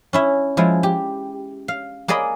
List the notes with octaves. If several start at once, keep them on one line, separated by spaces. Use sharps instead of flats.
C#4 E4 E5
F3 G#3 E4
G4
F5
A#3 G#4 D5 D#5 B5